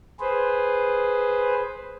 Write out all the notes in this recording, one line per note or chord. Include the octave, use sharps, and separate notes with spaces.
G#4 B4 C5